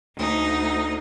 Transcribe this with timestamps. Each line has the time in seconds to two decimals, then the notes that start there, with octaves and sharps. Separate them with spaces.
0.16 D2 D#4